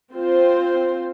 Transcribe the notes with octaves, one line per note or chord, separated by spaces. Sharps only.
C4 F4 C5